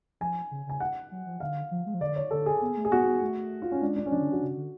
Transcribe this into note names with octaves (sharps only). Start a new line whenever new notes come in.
F3 G#5
C#3
C#3 G#5
F#5
F#3
F3
D3 F5
F3
G#3
F3
D3 D5
C#5
D3 A4
G#4
B3
A3
G#4
B3 F#4
B3
A3
F4
C#4
G#3 D4
D4
C#4
F3 D4
D3
F3 F#4
C#3
D3